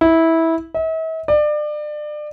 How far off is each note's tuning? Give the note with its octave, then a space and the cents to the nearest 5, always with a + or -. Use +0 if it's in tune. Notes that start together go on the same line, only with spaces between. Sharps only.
E4 -15
E5 -45
D5 +30